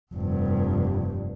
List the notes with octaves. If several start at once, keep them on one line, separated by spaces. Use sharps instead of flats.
F1 G2